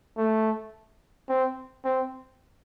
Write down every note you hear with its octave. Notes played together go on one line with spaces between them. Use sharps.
A3
C4
C4